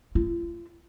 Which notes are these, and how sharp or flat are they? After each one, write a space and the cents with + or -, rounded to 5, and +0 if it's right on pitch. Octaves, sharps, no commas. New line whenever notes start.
F4 -40